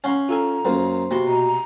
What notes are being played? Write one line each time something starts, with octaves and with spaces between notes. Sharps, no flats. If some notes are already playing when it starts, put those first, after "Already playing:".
C#4 F5 F#5 A#5 C6
F4 A4 G#5 A#5
F#2 A#3 C5
C3 A#3 B3 F#4 C6
B2 A#5